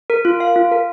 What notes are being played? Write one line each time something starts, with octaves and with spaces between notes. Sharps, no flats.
A#4
F4
F5
F4
A#4